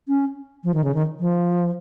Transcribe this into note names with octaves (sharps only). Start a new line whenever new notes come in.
C#4
F3
D#3
C#3
D#3
F3